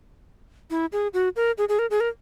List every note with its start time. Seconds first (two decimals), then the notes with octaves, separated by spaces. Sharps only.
0.71 E4
0.92 G#4
1.14 F#4
1.36 A#4
1.58 G#4
1.69 G#4
1.79 A#4
1.90 G#4
2.00 A#4